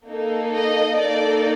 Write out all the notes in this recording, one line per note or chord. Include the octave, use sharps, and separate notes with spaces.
A#3 D#4 A4
D#5
A#3 D#4 A4 D5